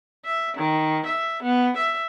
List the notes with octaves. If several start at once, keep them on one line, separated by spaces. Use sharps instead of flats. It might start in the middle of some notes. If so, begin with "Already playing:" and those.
E5
D#3
E5
B3
E5